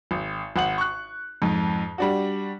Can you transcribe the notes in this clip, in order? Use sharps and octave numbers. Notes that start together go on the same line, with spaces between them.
G#1
G#1 F#5 F#7
C#6 F#6
F2 G#2
G3 D4 F#4